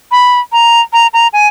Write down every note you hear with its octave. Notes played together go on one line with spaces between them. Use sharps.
B5
A#5
A#5
A#5
G#5